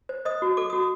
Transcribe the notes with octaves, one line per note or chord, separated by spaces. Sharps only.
C5
C5 D#5 D#6
F#4
A4 D6
F#4 D#6